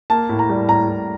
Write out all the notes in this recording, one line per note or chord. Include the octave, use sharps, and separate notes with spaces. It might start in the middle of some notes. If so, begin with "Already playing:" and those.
A#3 A5
A2
A#5
G3
A2 A#5
A2